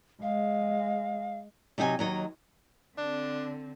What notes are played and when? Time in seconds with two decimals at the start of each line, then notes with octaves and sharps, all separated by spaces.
0.22 G#3 F5
1.78 C3 F#3 D#4 G4 F#5 G#5
1.99 D#2 F#3 D#5
2.98 D3 C4 D4